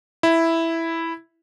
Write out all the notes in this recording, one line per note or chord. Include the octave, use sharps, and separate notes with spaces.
E4